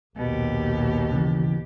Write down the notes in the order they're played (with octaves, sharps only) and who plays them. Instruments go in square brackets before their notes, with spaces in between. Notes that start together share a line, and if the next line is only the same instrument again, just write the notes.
[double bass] A#1 D#2 [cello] B2 G4
[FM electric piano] C#3 E3